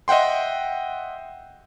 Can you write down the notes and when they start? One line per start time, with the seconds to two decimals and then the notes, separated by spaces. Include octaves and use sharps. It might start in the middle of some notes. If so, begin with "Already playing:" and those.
0.08 D#5 E5 F#5 G5 C6